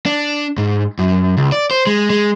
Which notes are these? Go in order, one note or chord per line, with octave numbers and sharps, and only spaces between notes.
D4
G#2
F#2
C#2
D5
C5
G#3
G#3